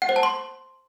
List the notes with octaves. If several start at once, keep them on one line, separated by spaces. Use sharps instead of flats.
F#5
C5
A5
C6